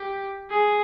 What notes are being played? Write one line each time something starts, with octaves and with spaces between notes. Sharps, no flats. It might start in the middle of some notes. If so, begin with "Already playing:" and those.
Already playing: G4
G#4